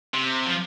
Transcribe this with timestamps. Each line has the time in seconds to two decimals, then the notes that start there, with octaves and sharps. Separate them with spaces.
0.14 C3
0.47 F3